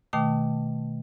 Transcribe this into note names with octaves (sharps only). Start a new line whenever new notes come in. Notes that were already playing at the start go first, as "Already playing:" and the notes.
B2 D#3 A3 G5 A5 D6